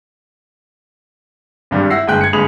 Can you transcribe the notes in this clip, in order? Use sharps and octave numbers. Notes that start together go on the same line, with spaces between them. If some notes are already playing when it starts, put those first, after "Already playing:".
G#1 G2 G3
E4 E5 F#5 E6 A#6 C7
G1 G#3 G5 F#6
G#6 C#7
G1 G#3 B5 D#6 F7 F#7